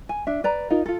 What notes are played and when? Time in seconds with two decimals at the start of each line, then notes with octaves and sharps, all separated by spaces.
0.09 G#5
0.27 D4 E5
0.44 B4 D5 A#5
0.70 D#4 F4 A#4
0.86 F4 A4